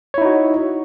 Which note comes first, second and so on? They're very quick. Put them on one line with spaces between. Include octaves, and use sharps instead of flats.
C#5 E4 D#4 F#4